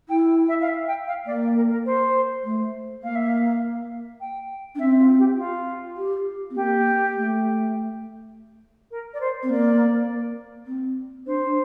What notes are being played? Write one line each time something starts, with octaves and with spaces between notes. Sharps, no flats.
E4 G5
E5
F5
E5
G5
F5
A#3 D5
A#4
A#4
C5
A3
A#3 F5
E5
F5
G5
D4
C4 E5
F4
G4
F4
G4
C4
A#3 G4
A3
A#4
D5
C5
C4
A#3 D5
C4
D4 C5
D4